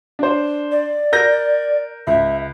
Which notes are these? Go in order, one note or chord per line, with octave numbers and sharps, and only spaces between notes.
D4 C5
D5
A#4 G6 A#6
C#2 E5